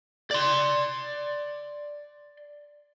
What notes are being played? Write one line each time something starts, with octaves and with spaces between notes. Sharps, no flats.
D5 C6